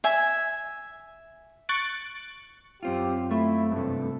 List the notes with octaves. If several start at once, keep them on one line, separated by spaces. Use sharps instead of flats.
E5 G#5
C#6 F#6 A6 D7
F#2 C4 F4 G4
A3 E4
G2 C3 A4